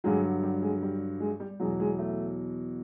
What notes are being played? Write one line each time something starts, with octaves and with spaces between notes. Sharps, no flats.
G2 D3 F#3 G#3
G3
G#3
G3
G#3
G3
E2 B2 F#3 G#3
G#3
A3